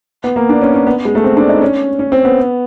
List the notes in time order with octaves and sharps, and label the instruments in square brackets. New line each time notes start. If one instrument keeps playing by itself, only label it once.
[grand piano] B3
A#3
D4
C#4
C#4
B3
G#3
A3
C4
D4
D#4
C#4
C#4
C4
B3